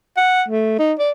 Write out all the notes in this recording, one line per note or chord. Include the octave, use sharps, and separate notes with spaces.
F#5
A3
D#4
D5